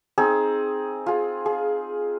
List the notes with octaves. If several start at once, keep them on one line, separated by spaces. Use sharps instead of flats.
C4 D#4 G#4
F4 G#4
G#4